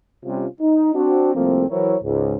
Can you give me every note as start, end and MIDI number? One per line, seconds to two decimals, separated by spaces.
0.25 0.46 48
0.25 0.46 55
0.25 0.46 61
0.25 0.46 65
0.60 0.92 63
0.94 1.33 60
0.94 1.33 62
0.94 1.33 66
1.34 1.64 36
1.34 1.64 53
1.34 1.64 57
1.34 1.64 58
1.34 1.64 60
1.70 1.97 52
1.70 1.97 54
1.70 1.97 64
1.70 1.97 70
1.70 1.97 72
1.70 1.97 73
2.03 2.37 37
2.03 2.37 44